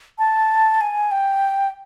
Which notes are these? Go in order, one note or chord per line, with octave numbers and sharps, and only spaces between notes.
A5
G#5
G5